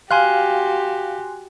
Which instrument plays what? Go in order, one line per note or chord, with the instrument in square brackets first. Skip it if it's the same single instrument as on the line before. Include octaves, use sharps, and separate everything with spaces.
[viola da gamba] F#4 G4 [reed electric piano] F5 [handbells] G#5 C6 F#6